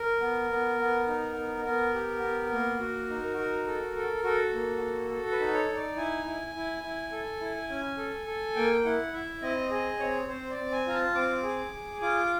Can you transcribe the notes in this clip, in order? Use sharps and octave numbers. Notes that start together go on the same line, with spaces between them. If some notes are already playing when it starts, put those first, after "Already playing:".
Already playing: A#4
B3
B3
B3
D#4
B3
B3 A#4
G4
B3
A#3
F#4
D#4
F#4
A4
A4
F#4 A4
A#3
F#4
A4
B4
D#4
C#5
D#4
D5
E4 G#5
E4
E4
E4
A4
E4
C#4
A4
A4
A#3 G5
E4 F#5
E4 E5
C4 D#5
G#4 D#5
C4 C#5
C4 C5
D5
C4
G#5
F4 A#5
A5
C4 D6
G#4
G#4
F4 D6